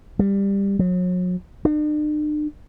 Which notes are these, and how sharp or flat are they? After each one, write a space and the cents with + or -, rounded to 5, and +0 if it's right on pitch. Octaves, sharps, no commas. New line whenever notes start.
G3 +15
F#3 -40
D4 +45